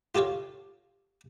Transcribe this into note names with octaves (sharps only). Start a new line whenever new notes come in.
F4 G4 A4 C#5 F5